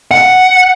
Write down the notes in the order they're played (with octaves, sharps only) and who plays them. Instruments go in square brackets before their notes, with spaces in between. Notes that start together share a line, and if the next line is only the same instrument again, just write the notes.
[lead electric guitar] F#5